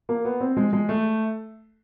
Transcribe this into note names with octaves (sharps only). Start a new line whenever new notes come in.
A#3
B3
C4
G#3
G#3
A3